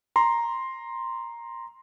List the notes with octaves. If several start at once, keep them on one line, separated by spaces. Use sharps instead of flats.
A#5 C6